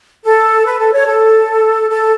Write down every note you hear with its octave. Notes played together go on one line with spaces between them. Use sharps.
A4
B4
A4
C#5
A4
A4